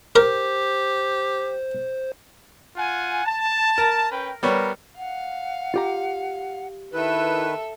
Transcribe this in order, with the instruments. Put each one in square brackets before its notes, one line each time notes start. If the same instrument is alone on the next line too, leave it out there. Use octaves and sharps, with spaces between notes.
[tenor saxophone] G4 [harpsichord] A#4 [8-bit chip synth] C5
[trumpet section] F4 F#5 G#5
A5
[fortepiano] A#4
[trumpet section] C#4 B4 G5
[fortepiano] G3 B3 C#5 [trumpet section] A#4
[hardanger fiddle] F5 [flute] F#5
[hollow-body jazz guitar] F4 G4 A#5
[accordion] D#3 B4 [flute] E4 [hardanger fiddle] A4 E5